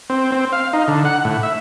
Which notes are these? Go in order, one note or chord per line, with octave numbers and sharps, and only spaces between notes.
C4
C4
F5
D#4
D3
F#5
A2
E5